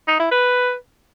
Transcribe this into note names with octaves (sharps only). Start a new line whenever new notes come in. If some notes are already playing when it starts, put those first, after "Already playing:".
D#4
E4
B4